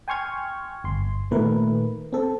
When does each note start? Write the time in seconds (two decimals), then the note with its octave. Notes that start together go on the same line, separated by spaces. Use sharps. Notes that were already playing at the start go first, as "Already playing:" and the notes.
0.08 G5 G#5 C6 C#6 F6 G#6
0.84 G1 C6
1.31 A#2 D#3 A3 A#4 B4
2.12 C4 A4